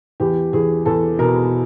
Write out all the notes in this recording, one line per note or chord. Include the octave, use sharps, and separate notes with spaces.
E2 G4
E2 G#4
E2 A4
B2 A#4